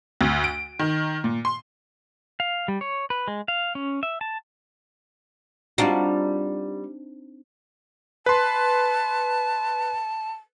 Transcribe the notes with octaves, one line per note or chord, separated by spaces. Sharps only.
D2
D7
D#3
A#2
C6
F5
G3
C#5
B4
G#3
F5
C#4
E5
A5
G3 C4 D4 D#4 F4 F#4
B4 A5 C6